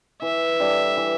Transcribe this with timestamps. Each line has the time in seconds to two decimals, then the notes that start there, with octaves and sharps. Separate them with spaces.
0.22 E3 E5
0.60 G3 D4 A4
0.97 E3